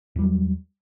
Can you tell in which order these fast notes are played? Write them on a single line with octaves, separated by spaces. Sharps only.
E2 G3 F#3